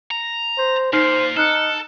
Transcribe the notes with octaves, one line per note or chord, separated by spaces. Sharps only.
A#5
C5
A#2 D#4 C5 F6 C7
D#4 A4 F6 F#6 C#7